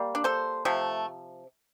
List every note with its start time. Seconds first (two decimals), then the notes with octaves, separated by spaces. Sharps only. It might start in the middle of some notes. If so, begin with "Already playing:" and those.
Already playing: G3 A#3
0.15 D4
0.24 A4 C5
0.65 C3 F3 A3